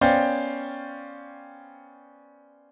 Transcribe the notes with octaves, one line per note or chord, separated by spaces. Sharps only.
B3 C#4 C5 D5 F5 G5